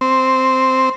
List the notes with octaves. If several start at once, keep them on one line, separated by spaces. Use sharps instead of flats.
C4